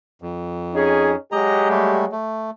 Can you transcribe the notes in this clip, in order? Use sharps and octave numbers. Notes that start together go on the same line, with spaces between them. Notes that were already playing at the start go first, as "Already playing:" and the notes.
F2
C#4 D#4 G#4
F#3 G#3 G4 D#5 A#5
G3 A3
A3